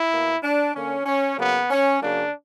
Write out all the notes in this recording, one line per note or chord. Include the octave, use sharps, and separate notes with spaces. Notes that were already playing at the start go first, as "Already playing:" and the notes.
Already playing: E4
B2 A#3
D4
D3 A#3 C#4
C#4
C#3 F#3 A#3 B3
C#4
C#3 F#3 A#3 D4